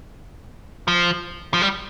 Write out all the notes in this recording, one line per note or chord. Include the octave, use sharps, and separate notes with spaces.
F3
F3
G3